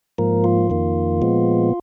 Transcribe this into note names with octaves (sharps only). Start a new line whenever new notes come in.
G#2 F3 A#3 A#4
F4
F2 D#3 A#3
A#2 F3 G#3 B3